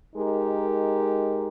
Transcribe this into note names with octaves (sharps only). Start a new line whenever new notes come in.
G#3 D#4 G4 A#4